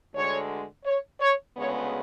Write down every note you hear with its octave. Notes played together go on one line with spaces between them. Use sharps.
D2 D3 G#3 C#5
C#5
C#5
D2 C#3 G#3 B3 C#5